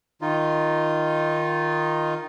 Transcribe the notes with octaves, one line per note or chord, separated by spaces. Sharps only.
D#3 D#4 F4